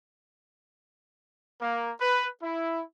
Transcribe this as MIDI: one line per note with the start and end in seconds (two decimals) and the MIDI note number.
1.60 1.91 58
2.00 2.28 71
2.42 2.82 64